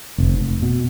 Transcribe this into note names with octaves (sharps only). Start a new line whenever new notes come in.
F1
B2